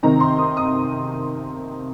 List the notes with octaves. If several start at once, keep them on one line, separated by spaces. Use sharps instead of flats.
C3 D#3 C4 D#4 A#5
C6
D#6
D#6